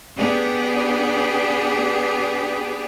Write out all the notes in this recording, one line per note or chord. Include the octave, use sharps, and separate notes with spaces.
B3 D4 G4 G#4